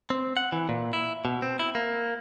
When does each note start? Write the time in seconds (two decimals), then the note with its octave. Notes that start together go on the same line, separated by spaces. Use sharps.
0.10 C4
0.37 F#5
0.52 E3
0.69 A#2
0.93 E4
1.25 B2
1.42 C4
1.59 E4
1.75 A#3